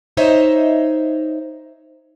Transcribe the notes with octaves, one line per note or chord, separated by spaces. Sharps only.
D#4 C5 C#5 D#5 E5